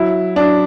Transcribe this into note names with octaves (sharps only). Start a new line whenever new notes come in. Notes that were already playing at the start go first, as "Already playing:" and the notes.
Already playing: F#3 E4
F#3 D4